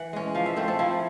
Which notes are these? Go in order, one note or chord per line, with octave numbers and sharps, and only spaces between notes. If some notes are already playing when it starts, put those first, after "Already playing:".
Already playing: E3 F#5
G#3 C#4
F3 F5
E5
A3 C4 C5
A4
F3 E4